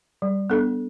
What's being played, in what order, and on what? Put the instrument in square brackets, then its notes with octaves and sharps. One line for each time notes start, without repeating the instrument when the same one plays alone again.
[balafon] G3
B3 D4 A4